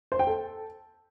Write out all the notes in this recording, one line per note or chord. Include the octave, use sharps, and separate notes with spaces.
C5
G5
A4